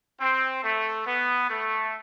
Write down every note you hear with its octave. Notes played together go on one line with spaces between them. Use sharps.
C4
A3
B3
A3